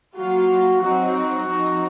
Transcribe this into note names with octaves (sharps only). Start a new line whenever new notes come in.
F#3 A#3 F4 F#4
F#3 C4 D#4 F#4
F#4
F3 C4 D#4